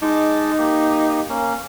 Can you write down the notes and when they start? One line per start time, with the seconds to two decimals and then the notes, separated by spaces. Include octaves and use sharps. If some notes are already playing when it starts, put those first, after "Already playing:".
0.02 G#3 D#4 A5 D6
0.58 A#3 G4
1.29 A#3 C#4